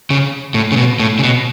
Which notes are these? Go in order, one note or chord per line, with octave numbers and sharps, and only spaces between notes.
C#3
A2
C#3
B2
A2
C#3
B2